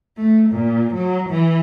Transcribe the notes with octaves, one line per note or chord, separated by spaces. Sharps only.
A3
A#2
F#3
E3